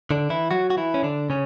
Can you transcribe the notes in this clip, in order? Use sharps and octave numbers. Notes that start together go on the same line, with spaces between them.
D3 D4
E3 E4
F#3 F#4
F#4
E3 E4
C#4
D3 D4
C#3 C#4